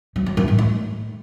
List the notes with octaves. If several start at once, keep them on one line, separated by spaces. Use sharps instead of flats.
F#3
F#3
F#2
A2
A3